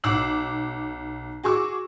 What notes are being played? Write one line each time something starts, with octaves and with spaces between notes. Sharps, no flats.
B1 D6 E6 C7 F#7
F#4 G#4 C#6 D6 E6